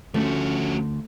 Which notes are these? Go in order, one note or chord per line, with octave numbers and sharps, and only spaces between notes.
D2 F3 A3 C#4 F#4